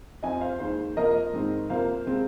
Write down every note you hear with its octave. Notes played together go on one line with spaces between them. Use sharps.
F2 F3 C4 D#5 G#5
C5 F5
D#2 D#3 G#3 C5
F2 C3 F3 A#3 A#4 D#5
G#2 D#3 C4
F2 C3 F3 A#3 C5 F5
C3 G#3 C4